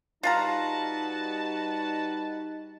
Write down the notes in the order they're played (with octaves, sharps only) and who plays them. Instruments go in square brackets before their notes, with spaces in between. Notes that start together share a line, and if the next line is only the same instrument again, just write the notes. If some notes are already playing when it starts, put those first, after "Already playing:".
[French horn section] G3 D#4 [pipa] F4 F5 A#5 [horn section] F#4 B4 A5